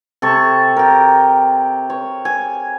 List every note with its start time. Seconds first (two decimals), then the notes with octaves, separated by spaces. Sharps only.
0.22 C3 A4 C#6
0.76 G4 A#4
1.90 C#5
2.25 G#5